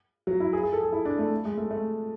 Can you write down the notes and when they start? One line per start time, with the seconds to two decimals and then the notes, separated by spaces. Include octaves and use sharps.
0.27 F#3
0.40 E4
0.53 G#4
0.63 G#4
0.73 A4
0.83 G#4
0.92 E4
1.05 D4
1.18 A3
1.45 G#3
1.58 A3
1.70 A3